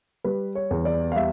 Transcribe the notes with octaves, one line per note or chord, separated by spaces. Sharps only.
G3 B4
C#5
E2
D5
F5
G3 E5